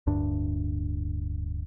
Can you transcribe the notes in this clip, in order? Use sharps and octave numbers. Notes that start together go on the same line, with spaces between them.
D1 D2 G2 D4